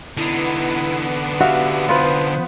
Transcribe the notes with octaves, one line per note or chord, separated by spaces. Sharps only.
D3 B3 D#4 E4
F#4 G4 E5 F5
F4 B4 C5